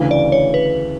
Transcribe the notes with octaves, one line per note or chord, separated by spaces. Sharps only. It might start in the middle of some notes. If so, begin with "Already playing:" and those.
Already playing: D2 C#3 E3
D5
C#5
B4